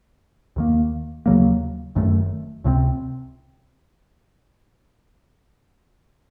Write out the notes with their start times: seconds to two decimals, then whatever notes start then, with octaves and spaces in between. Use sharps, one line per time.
0.56 D#2 D#3 A#3
1.26 D#2 C#3 F#3 A#3
1.95 F#1 F#2 D#3 A3
2.64 C#2 C3 F#3 C4